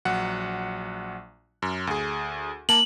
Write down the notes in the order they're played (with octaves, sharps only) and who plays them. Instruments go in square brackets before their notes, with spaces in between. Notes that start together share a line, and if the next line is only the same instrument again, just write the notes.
[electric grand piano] A#1 F#3 F#5
F#2
D2 G#4
[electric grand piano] A#3 A5 [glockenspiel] F#7